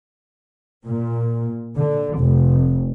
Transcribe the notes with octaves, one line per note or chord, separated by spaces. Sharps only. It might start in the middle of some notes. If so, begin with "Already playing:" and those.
A#2
D3
F1